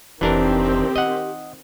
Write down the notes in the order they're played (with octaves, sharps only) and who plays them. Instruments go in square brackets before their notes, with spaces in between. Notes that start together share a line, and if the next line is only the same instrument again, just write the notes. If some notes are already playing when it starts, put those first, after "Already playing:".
[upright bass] F1 [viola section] D#3 C4 [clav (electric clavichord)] E3 D4 A#4 [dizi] G4
[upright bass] D#4 F4 [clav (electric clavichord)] D#5 F#5